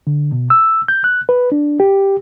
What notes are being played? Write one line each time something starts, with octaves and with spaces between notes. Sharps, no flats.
D3
B2
E6
G6
F#6
B4
D4
G4